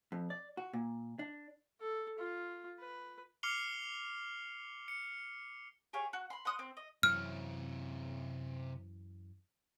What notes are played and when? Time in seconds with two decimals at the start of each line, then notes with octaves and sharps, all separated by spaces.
0.12 F2
0.30 D5
0.57 F#4
0.73 A#2
1.19 D4
1.80 A4
2.18 F4
2.80 B4
3.43 D6 F6 C7 C#7 F7 G7
4.88 C#7
5.93 G4 G#4 C#5 F5
6.13 F#4
6.30 B5 C6
6.45 F#5 C6 D#6 F#6
6.59 C4
6.77 D#5
7.03 F#2 C3 E3 C#5 F6